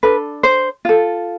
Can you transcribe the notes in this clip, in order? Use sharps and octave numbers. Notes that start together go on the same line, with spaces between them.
D4 A4 B4
C5
F4 A4